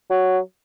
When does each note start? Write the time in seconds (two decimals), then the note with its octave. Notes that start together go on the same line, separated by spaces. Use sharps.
0.10 F#3